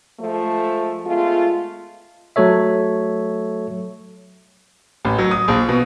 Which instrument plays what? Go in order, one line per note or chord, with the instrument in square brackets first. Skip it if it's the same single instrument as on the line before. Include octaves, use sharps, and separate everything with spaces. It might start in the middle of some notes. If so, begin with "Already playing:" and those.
[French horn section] F3 G#3 A3
G#3 A3 B3 F4
[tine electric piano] F#3 A3 A4 C#5 E5
[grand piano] A1
F#3
D#6
A#1
B2